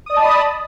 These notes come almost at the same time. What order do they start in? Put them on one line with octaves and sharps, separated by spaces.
D#6 D5 D#5 A5 B5